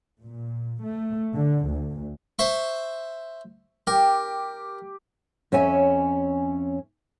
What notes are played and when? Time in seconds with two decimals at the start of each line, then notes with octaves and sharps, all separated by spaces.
0.21 A#2
0.81 A3
1.35 D3
1.66 D2
2.39 C5 E5 C#6
3.87 G4 A#4
5.52 F2 C#4 C#5 E5 G#5